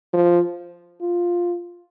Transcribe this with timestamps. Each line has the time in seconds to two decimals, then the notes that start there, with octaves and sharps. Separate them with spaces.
0.14 F3
1.01 F4